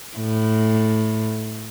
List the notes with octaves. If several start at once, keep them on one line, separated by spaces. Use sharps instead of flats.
A2